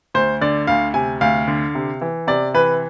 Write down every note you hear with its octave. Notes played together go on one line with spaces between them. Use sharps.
D2 C5
D3 D5
D2 F5
C3 G#5
D2 F5
D3
C3
E3
C3 D5
E3 B4